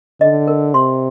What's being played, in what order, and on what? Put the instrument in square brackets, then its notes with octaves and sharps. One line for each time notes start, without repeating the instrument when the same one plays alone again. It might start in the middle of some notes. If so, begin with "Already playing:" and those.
[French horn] D3 [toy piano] D#5
[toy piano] A#4
[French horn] C3 [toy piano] C6